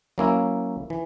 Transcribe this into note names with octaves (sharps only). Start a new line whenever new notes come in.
F#3 A#3 C#4 E4
E3